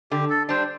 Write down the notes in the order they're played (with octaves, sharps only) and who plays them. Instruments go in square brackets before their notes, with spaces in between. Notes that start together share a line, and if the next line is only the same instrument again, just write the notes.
[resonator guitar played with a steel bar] D3 [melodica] G4
[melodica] A4
[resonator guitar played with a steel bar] G3 D4 [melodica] C5